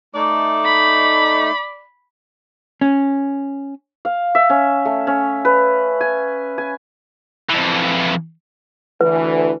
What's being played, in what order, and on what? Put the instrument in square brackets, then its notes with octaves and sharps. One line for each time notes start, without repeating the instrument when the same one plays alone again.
[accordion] A3 D#4 [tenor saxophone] D5
[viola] B5
[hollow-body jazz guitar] C#4
[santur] F5
E5
C#4
A3
C#4
B4
G#5
G#5
[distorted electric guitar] F2 E3
[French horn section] D2 E3 [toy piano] B4